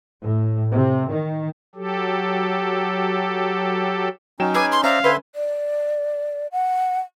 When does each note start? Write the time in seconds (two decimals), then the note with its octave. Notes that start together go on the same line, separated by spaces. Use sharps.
0.22 A2
0.72 C3
1.10 D#3
1.75 F#3 G4 A4
4.40 F#3 C#4 D#4 G5 E7
4.54 G#4 B4 G#5 D6 E6
4.72 C6
4.84 C#4 C5 D5 E5 F5 A#5
5.04 D3 B4 C5 E5 G#5 C6
5.35 D5
6.52 F#5